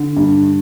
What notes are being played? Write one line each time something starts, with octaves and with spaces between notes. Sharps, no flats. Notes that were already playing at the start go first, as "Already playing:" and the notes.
Already playing: D3
G2